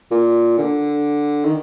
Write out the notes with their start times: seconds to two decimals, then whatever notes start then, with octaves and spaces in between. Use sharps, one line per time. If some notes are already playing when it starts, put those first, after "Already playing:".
0.11 A#2
0.58 D3
1.45 D#3